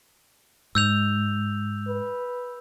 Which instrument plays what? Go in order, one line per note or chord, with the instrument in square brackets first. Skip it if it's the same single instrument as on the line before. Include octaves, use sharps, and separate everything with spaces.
[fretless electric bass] G#2 [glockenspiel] E6 G6 F7
[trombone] B4